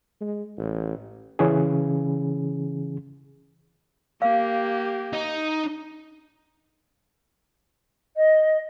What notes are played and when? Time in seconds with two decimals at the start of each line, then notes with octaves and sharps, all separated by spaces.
0.21 G#3
0.58 A1
1.39 C#3 E3 C#4 G#4
4.22 A#3 G4 F5
5.13 D#4
8.16 D#5